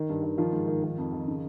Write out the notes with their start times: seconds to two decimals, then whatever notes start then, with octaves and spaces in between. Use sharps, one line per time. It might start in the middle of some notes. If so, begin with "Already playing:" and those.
Already playing: D#3 D#4
0.09 G2
0.23 D#3
0.38 D#3 F3 F4
0.53 G#2
0.67 D#3
0.83 D#3
0.98 F2
1.13 D#3
1.27 C#3